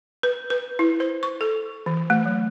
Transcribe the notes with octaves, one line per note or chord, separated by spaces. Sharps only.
B4
B4
E4
C5
C#6
A4
E3
A3
F#3